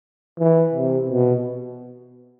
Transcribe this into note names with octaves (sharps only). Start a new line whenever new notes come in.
E3
C3
B2